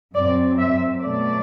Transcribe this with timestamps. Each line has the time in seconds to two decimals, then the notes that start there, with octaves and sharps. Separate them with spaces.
0.15 F#2 F#3 C4 D5
0.58 E5
1.01 B2 F#3 A3 D5